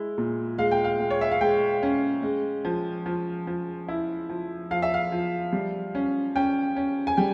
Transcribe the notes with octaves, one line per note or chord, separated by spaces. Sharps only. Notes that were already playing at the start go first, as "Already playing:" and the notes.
Already playing: G#3 E4
A#2
G#3 F5
G5
F5
G#3
C#5
E5
F5
G#3 G5
C#4
G#3
F3
F3
F3
E4
F3
F3 F5
E5
F5
F3
G3
C#4
C#4 G5
C#4
G#5
G3 G5